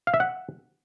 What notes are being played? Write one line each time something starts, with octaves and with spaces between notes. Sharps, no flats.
F5
E5
F#5